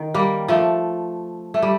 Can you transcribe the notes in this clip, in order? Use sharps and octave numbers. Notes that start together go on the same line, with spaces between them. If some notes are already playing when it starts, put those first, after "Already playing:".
Already playing: D#3
G3 A#3
F3 A3
A3
G3